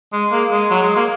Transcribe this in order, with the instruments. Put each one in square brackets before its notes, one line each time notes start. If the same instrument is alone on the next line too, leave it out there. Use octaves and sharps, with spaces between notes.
[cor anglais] G#3
[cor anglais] A#3 [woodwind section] G#4
[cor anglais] G#3
F#3
G#3
A#3